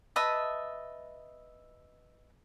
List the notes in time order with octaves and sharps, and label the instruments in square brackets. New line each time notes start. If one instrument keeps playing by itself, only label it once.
[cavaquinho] B4 D#5 E5 A5